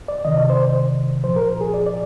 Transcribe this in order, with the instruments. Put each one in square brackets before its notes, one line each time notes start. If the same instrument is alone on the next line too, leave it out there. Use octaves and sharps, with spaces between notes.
[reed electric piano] D5
C2 C3 D#3 D#5
D5
C5
C2 A#2 F3 C5
A#4
G#4
D5
D5